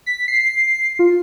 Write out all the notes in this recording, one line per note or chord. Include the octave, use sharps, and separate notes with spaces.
B6
C7
F4